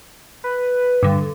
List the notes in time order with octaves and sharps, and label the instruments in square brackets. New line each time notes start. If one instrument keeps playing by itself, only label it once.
[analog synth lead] B4
[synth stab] G2 D3